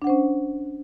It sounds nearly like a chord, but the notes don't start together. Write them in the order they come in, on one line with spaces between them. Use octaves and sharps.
D4 F#5 C5 C#4